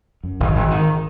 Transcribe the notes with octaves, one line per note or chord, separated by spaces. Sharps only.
F#2
G#1
G#1
D#3